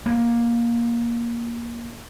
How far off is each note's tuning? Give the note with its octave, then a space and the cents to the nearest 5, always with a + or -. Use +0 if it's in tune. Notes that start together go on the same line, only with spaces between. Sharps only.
A#3 +15